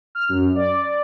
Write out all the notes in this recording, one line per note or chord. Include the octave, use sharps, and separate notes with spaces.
F6
F#2
D5